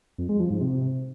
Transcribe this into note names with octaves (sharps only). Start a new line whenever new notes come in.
F2
G#3
F3
G#2
C3